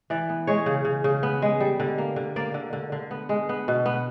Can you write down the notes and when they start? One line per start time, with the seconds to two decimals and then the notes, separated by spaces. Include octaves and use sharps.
0.10 E3 D5
0.29 B3
0.47 G#3 C#5
0.66 C#3
0.85 C#3
1.04 C#3
1.23 B3
1.42 G#3
1.60 G3
1.80 D3
1.98 A#3
2.16 D3
2.36 A#3 D5
2.54 D3
2.73 D3
2.92 D3
3.11 B3
3.29 G#3
3.49 B3
3.68 B2
3.86 B3